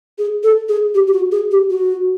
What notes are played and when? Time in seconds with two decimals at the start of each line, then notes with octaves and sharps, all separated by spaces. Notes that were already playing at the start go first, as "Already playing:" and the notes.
0.19 G#4
0.44 A4
0.69 G#4
0.95 G4
1.07 G4
1.13 F#4
1.32 G#4
1.51 G4
1.70 F#4